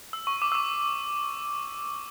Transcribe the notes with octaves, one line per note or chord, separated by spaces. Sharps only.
E6
C#6
D6
E6
D6